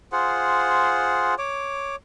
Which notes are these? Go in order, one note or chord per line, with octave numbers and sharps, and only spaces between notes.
F4 G#4 C5 F#5
C#5 D6